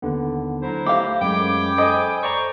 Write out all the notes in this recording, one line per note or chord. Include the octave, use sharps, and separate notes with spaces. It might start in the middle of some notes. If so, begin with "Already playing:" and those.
D#2 D3 B3
F#3 E4 C5 A#5
A3 G4 F5
F#2 G#3 C#5 G5 B5 D6
A4 C5 D#5 G#5
C5 D5 A#5 C#6